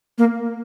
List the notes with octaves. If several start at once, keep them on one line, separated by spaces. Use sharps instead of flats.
A#3